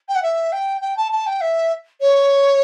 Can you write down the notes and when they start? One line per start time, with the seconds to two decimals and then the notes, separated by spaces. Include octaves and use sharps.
0.08 G5
0.15 F#5
0.22 E5
0.52 G5
0.81 G5
0.97 A5
1.11 A5
1.26 G5
1.41 E5
2.01 C#5